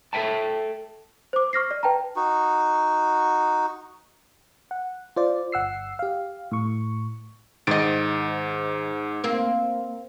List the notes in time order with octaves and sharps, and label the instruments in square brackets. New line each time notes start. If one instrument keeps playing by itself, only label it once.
[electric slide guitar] A4 B4 E5 G5 A5
[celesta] C5 D6
C#6 F6 A#6 C7
D5
B4 G5 A5 A#5
[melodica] D#4 F#4
[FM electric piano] F#5
F4 C5 D5
G1 F#5 E6 C7
G4 F5
A2 C#6
[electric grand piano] G#2 A6 D7 [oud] D#3 D#5
[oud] A#3 C4